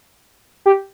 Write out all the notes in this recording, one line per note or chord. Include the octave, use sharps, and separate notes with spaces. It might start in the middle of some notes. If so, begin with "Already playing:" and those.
G4